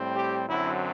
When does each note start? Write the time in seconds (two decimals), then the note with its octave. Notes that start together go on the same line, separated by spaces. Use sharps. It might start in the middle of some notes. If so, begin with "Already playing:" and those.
Already playing: A2 G3 C4
0.14 G4
0.47 F#2 D3 F#3 C4 E4